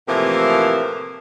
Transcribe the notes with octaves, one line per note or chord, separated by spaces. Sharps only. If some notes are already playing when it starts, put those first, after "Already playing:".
A2 C3 E3 F3 A3 A#3